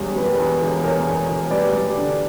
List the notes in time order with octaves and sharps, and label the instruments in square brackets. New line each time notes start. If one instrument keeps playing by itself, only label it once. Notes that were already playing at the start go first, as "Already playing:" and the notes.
Already playing: [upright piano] E1 E2 G3
G3 B4
A#4
E2 B4
E1
E2 A#4 C#5
E2
E1
G3 B4 D5
G3
D3